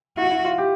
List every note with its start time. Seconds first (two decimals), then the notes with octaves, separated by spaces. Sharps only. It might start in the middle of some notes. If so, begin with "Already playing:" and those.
0.17 E4 F#4
0.30 E4
0.45 F4
0.58 G4